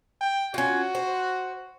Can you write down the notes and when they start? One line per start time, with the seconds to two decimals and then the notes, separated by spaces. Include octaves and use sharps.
0.21 G5
0.54 C#4 F4 F#4
0.95 C5